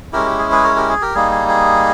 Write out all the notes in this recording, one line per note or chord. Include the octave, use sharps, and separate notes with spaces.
G#3 C#4 E4 G4 A#4
G4
G#4
G#4 B4
A#4 C#5
G4 A#4
G#4
G4 A#4
G3 A#3 D#4 G#4
G#4
G#4